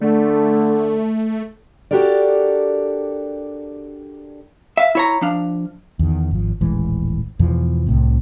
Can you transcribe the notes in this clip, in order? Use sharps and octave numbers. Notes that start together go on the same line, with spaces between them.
D3 A3
D4 F#4 G4 A4 A#4 D5
E5 F5
E4 C#5 A#5
F3 D4 F5
E2 D#3
G#1 F3
D#1 A1 E3 G#3
E2 B2 E3 F3
C2 A2 C3